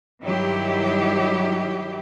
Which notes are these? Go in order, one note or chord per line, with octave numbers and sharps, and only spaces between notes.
G2 D#3 F#3 G3 E4 G4